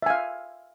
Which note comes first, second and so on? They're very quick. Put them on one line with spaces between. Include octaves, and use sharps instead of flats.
E5 G#5 F5